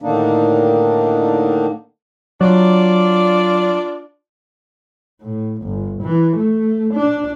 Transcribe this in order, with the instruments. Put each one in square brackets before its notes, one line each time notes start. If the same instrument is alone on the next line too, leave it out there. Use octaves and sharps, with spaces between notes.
[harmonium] A2 D3 D#3 A#3 D4 D#4
[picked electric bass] F#3 [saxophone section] D4 F4 D5
[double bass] A2
G1
E3
A3
D4